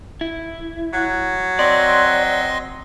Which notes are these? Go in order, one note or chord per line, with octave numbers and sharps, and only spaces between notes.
E4
F#3
C4 D5 D#5 C6